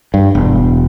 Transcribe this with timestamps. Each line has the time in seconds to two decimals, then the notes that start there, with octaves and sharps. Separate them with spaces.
0.14 G2
0.35 E1